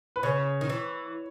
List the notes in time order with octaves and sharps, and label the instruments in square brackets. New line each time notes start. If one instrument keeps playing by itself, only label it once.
[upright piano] B4
[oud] C#3 [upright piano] C#5
[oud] D#3
E3